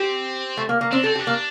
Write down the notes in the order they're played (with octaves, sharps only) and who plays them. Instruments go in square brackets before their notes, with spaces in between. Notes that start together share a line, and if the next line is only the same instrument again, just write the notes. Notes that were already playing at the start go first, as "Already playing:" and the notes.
Already playing: [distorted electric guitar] C4 [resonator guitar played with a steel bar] G4
[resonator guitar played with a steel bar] A3
A#3
A#3
[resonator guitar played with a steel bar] C4 [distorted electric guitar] D4
[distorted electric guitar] C4 [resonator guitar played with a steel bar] A4
[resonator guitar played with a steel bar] G4
[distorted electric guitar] D4
[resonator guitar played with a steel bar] A#3